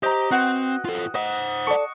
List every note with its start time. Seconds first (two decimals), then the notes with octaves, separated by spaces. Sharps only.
0.03 G4 C5 D#5 A#5
0.31 C4 F#4 B4 F#5 G5
0.85 F4 A4
1.15 C5 D#5 F#5
1.67 A4 D5 C#6